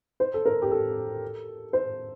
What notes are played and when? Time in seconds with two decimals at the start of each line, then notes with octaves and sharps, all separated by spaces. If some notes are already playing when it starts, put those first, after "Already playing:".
0.20 C5
0.34 A4
0.45 A#4
0.62 G4
0.71 A4
1.73 C5